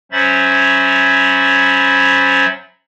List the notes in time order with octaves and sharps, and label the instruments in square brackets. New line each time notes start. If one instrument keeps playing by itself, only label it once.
[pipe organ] F#3 C#4 C5 E5 B5 A6